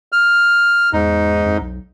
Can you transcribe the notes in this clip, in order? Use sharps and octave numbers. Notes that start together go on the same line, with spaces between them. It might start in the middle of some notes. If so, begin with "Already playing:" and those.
F6
E2 G#2 D#4
F2
B1